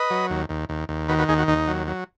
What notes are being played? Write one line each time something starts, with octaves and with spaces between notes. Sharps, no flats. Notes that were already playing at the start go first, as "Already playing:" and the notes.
Already playing: B4 D#5
F#3
D#2
D#2
D#2
D#2
D#3 F#4 B4
F#4 B4
D#2 D#4 G#4
F#4
D#2 D#4
F#3
F#3